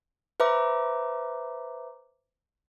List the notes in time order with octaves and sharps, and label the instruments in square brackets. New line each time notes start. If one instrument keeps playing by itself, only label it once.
[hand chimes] B4 C5 E5 A#5 D6